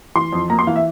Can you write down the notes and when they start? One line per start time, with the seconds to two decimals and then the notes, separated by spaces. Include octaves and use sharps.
0.16 E3 C6
0.33 F2
0.50 A#3 A#5
0.59 C6
0.67 E3 F5
0.76 E5